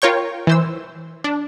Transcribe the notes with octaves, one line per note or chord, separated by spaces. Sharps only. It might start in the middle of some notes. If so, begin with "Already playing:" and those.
F4 A#4 C#5 G5 C#6
E3 C5 E6
D4